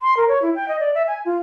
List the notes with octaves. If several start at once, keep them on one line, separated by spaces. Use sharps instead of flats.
C6
A#4
C#5
E4
G5
D#5
D5
E5
G#5
F4